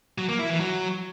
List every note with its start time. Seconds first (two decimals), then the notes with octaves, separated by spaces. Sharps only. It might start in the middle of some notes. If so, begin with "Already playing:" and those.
0.18 F#3
0.29 A#3
0.39 E4
0.50 E3
0.60 F#3